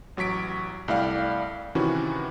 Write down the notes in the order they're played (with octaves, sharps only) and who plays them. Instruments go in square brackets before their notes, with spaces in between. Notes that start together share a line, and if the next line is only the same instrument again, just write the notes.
[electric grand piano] A1 F#3 C#6 B6 D7
C2 A3 E4 D5 F5 G5
C3 D#3 E3 C#4 E4 F#4